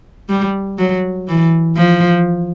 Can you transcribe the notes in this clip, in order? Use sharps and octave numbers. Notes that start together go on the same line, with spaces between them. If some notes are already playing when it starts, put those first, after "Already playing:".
G3
F#3
E3
F3